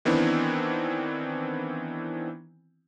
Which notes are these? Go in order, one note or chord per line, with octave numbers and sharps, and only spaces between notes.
D#3 E3 B3 C4 D4 E4